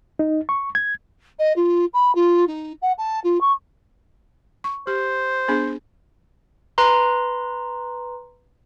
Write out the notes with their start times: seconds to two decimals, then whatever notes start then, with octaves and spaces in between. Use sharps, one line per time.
0.19 D#4
0.49 C#6
0.75 G#6
1.39 D#5
1.56 F4
1.93 B5
2.15 F4
2.47 D#4
2.82 F#5
2.98 A5
3.24 F4
3.41 C#6
4.64 C#6
4.87 G4 C5
5.48 B3 D4 G#4
6.78 B4 A#5 C6